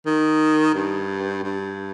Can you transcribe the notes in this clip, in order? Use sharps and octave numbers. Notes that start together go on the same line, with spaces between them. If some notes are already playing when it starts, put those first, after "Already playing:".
D#3
G2
G2